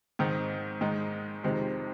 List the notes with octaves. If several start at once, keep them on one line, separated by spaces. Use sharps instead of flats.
G#2 D#3 C4 D#4
G#2 D#3 G#3 D#4
F2 C3 D#3 G#3 C4